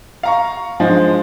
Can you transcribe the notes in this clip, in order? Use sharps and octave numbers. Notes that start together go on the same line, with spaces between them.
F5 A#5 C#6
F3 G#3 D4 D#4